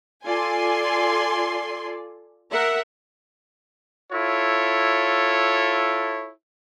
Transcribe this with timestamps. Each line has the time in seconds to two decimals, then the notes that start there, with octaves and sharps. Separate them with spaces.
0.24 F4 A4 D5 G#5 C6
2.50 A#4 E5 F#5
4.11 E4 F4 A4 C#5